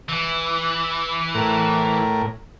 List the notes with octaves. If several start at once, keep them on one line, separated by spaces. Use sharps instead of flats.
E3
A2 A#4